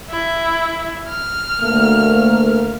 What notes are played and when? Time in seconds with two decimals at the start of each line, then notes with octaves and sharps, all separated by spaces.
0.10 E4
1.09 F6
1.62 D2 A3 A#3